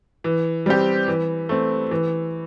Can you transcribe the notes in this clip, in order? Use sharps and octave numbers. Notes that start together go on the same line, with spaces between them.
E3
G3 C4 G4
E3
A3 C4
E3